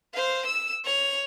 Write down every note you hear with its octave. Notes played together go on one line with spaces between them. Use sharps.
C5 F5
E6 E7
C#5 F7